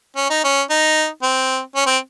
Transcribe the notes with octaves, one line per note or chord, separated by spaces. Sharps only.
C#4
D#4
C#4
D#4
C4
C#4
C4